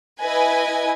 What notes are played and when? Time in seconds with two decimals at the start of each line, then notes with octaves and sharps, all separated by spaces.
0.21 E4 B4 D#5 G#5